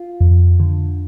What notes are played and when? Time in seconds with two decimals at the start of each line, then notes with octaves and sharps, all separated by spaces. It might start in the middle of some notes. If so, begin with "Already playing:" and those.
Already playing: F4
0.21 F2
0.60 D3